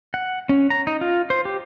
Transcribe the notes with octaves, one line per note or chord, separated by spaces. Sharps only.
F#5
C#4
A#5
D#4
F4
C5
G4